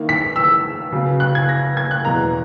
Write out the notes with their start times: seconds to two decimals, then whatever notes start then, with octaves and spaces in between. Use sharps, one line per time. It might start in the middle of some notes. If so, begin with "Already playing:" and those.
Already playing: D#3 A#3 E4
0.09 B6
0.36 E6
0.92 C#3 F#3 B3
1.20 F#6
1.35 G#6
1.49 A#6
1.77 G#6
1.91 F#6
2.05 E2 B2 A#3 A#5